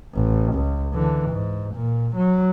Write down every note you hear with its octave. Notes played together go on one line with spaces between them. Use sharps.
A1
C#2
D3 E3
G#2
A#2
F#3